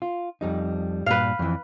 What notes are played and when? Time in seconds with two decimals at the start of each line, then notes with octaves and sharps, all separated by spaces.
0.02 F4
0.41 F2 G3 D#4
1.06 G2 A#2 B4 F5
1.39 F2 E3